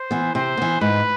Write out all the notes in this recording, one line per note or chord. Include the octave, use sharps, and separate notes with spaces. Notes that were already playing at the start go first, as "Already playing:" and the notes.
Already playing: C5
E3 B3
C3 C5
E3 B3
G#2 B4